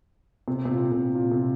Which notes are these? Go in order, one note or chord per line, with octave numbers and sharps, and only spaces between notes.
C3
C3
A#2
C3
A#2
C3